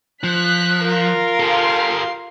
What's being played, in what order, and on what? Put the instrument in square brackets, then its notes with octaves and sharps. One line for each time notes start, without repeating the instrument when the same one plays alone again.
[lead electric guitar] F3 [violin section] F#6 B6
[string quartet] F4 A#4
[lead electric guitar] G4 A4 [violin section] F5 C6